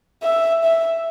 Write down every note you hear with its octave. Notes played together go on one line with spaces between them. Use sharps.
E5
E5